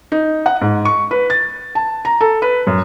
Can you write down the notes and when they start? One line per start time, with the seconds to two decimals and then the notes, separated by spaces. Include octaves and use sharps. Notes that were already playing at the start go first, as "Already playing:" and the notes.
0.12 D#4
0.46 F#5
0.61 G#2
0.85 C#6
1.11 B4
1.30 A6
1.75 A5
2.05 A#5
2.21 A4
2.42 B4
2.67 F#2